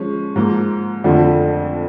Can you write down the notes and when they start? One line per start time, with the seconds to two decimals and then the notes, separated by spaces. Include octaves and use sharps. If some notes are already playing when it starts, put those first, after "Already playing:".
Already playing: F3 G#3 C#4
0.36 G#2 F3 A#3
1.04 F2 D3 F3 A3